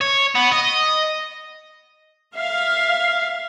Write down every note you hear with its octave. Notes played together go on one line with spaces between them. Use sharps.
C#5
B3
D#5
E5 F5